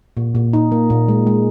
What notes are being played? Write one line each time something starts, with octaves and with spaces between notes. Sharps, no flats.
A#2
A#2
D#4
A#3
A#2
G#3
G#3